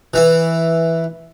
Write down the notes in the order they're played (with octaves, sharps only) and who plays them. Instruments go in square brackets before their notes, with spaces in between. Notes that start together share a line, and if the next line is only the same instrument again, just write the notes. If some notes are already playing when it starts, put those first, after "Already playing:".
[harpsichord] E3 E4